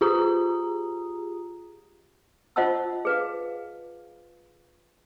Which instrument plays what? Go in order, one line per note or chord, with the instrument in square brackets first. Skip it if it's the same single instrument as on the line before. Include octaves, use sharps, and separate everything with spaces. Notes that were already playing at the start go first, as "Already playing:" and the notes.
[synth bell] F4 G4 G#4 A#5 D#6
[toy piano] F4 C5 D#5 F#5 A5 E6
G#4 B4 F5